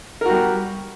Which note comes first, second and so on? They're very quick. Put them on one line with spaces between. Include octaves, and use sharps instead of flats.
A#4 F#4 G3